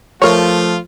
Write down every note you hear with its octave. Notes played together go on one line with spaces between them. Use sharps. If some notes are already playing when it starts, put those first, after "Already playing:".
F3 A3 F4 A#4 C#5